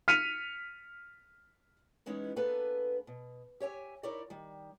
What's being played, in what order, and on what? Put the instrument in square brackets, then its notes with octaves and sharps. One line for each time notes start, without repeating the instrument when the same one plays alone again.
[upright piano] F6 B6 C#7 D#7 F7
[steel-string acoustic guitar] E3 G#3 B3 C#4 D#4 E4
A#3 B3 D4 G#4 A4 B4
B2
G4 C#5 E5 G#5
D#4 E4 A#4 C#5 D5 E5
D#3 G3